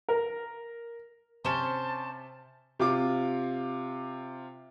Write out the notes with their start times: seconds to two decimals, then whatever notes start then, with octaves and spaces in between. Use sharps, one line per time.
0.09 A#4
1.45 C3 C#4 C5 A5 E7
2.79 C3 F4 D6